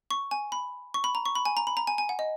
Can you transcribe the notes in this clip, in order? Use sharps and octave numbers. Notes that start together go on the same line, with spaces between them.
C#6
G#5
B5
C#6
B5
A#5
C#6
B5
G#5
A#5
B5
A#5
G#5
G#5
F#5
D#5